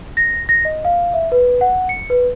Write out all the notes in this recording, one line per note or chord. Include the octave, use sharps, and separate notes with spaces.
A#6
A#6
D#5
F5
E5
B4
F#5
C#7
B4